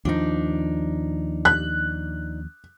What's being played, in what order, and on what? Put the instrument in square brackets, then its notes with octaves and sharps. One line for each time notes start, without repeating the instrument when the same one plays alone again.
[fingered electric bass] D#2 F3 [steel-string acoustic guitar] D4 D#4
[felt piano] F#6